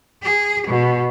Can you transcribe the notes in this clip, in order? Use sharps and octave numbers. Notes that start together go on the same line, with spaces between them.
G#4
B2